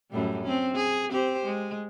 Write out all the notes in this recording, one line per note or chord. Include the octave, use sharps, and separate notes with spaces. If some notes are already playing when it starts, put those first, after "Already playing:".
F#2 A2 G3
C4 C#4
G#4
C4 G4 C5
G#3